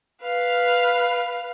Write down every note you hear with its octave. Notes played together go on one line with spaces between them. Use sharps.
B4 F5